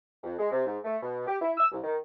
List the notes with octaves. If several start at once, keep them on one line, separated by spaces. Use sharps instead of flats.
F2
G#3
C3
G#2
A3
B2
G4
E4
E6
C2
D#3